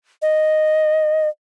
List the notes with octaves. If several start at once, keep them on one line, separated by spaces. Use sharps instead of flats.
D#5